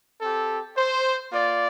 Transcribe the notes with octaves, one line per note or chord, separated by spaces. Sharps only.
C4 G4 A4
C5
A#3 F4 D5